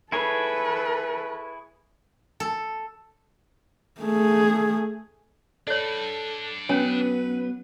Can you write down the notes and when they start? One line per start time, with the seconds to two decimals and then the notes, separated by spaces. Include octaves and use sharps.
0.12 E4 G#4 A4 B4 C#5
2.40 A4
4.01 A3 G#4
5.67 D4 A4 C#5 D5 B5
6.69 F#3 B3 C#4 B4 C#5 G#5